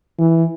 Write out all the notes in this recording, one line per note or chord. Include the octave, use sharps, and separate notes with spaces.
E3